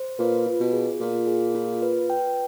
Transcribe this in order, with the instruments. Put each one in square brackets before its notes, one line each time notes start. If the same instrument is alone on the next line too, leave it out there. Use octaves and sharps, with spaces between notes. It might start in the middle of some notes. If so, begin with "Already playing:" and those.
Already playing: [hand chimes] C5
[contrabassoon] A#2 [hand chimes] B4
[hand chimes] F4
[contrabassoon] B2
[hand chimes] G#4
[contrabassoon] A#2 [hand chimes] F4
[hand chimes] G#4
F4
B4
G5